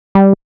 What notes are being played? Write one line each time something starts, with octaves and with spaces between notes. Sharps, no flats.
G3